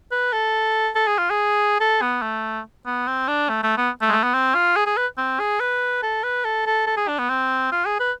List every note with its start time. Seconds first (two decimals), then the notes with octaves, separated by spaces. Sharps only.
0.12 B4
0.33 A4
0.96 A4
1.07 G#4
1.18 F4
1.30 G#4
1.80 A4
2.02 B3
2.22 A3
2.86 B3
3.07 C4
3.28 D4
3.49 A3
3.63 A3
3.77 B3
4.02 A3
4.09 G#3
4.12 A3
4.24 B3
4.34 C4
4.55 F4
4.76 G#4
4.86 G#4
4.97 B4
5.18 C4
5.39 G#4
5.60 B4
6.03 A4
6.24 B4
6.45 A4
6.66 A4
6.87 A4
6.97 G#4
7.08 D4
7.19 B3
7.30 C4
7.72 F4
7.86 G#4
8.00 B4